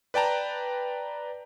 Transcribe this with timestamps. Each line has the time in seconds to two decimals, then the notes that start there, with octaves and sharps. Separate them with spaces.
0.14 B4 D5 G5 A5 A#5